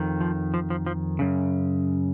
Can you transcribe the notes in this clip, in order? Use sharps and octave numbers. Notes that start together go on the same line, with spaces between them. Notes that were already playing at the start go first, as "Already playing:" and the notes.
Already playing: F2 D#3
F3
F3
F3
F3
F#2 C#3